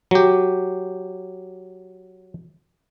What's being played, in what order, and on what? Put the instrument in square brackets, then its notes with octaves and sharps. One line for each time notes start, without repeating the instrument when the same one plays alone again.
[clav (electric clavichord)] F#3 G4